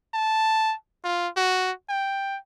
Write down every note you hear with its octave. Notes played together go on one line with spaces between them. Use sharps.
A5
F4
F#4
G5